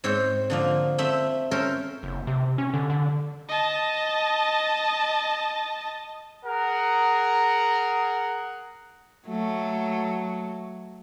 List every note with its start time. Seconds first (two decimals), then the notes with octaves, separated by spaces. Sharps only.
0.04 G#2 C4 C5 C#5
0.50 D3 F3 A#3
0.98 A3 C4 E5
1.51 C#4 A4 A#4 C5
2.03 F#1
2.27 C3
2.58 C#4
2.74 D3
2.90 D3
3.49 D#5 A5
6.45 G#4 A#4 F#5
9.27 F#3 A3